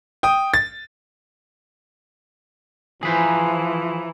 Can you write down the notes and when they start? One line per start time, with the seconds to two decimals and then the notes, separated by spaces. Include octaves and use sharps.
0.23 G5 D#6
0.54 A6
3.03 E3 F3 G#4 B4 C5 G#5 A#5